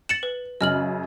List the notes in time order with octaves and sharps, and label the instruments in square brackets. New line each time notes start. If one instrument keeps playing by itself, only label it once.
[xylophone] A6 C#7 E7 [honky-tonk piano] F#7
[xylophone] B4
[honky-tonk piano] F#2 C#3 [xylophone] D#5 F6 F#7